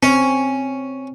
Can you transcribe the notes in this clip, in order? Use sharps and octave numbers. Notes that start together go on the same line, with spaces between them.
C4 C#4